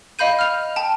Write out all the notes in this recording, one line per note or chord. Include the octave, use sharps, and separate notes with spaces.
D#5 F5 B5 G6 D#7
F6 F7
G5 A5